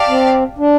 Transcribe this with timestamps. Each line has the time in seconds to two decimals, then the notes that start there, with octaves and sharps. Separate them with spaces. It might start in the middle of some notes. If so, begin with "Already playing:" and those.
Already playing: G4 D5 F5 A5
0.08 C4
0.58 D4